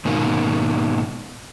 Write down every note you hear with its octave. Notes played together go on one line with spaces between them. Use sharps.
G#2 B2 D#3 A#3